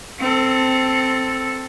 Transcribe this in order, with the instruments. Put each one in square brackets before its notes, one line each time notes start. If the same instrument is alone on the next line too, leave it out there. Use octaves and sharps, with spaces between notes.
[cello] C4 A4